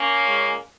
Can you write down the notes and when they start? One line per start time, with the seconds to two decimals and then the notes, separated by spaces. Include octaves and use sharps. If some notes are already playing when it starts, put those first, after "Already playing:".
Already playing: A#3 C#4
0.23 A#2 G#3